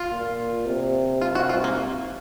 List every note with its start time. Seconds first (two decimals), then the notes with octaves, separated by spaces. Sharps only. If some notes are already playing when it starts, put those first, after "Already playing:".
Already playing: F4
0.10 A#2
0.66 C3
1.21 C3 F4
1.35 F#4
1.49 F4
1.64 A#3